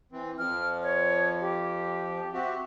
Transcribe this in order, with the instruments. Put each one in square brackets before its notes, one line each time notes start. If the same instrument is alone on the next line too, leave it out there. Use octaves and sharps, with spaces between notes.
[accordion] E3 C4
[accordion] F2 F3 [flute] F6
[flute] C#5
G4
[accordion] C4 F#4 G4 [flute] E5